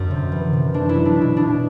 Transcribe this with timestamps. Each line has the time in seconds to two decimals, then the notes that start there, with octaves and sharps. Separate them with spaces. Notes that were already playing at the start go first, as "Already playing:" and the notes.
Already playing: F#2 D3 F#4
0.11 C3
0.32 E3
0.53 C3
0.74 C4 D4
0.89 E4
0.95 F#3
1.05 D4
1.16 B2
1.21 E4
1.37 B2 D4